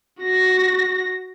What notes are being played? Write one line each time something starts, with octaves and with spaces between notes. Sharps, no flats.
F#4 A#6